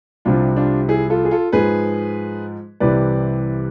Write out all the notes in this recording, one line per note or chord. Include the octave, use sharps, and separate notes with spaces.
C2 C3 F3 D4 F4
D4 F4
E4 G#4
F4 A4
G#4
F4 A4
G#2 F3 G#4 B4
C2 C3 E3 B4 D5